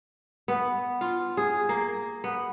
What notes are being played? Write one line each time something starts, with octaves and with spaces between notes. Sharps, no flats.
B3
F4
G#4
A#3
B3